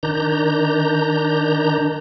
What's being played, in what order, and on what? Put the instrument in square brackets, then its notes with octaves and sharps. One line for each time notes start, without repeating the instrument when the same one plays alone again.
[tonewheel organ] D#3 D4 A#5 G6